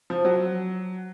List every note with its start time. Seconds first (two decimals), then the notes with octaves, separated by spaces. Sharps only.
0.10 F3
0.25 F#3